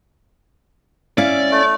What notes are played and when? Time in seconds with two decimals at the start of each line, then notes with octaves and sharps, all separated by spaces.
1.18 C#4 E4 D5 F5
1.52 A3